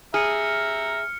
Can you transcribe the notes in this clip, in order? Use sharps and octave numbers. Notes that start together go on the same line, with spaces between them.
G#4 E5 A#5 F6 C#7